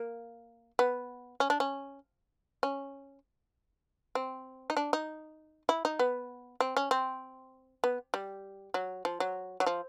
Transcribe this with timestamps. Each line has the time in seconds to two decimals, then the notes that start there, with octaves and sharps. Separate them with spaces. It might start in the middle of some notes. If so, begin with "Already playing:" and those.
Already playing: A#3
0.79 B3
1.40 C#4
1.50 D4
1.60 C#4
2.63 C#4
4.15 C4
4.70 D#4
4.77 D4
4.93 D#4
5.69 E4
5.85 D#4
5.99 B3
6.60 C4
6.77 C#4
6.91 C4
7.84 B3
8.14 G3
8.74 F#3
9.05 F3
9.20 F#3
9.60 F#3
9.66 F3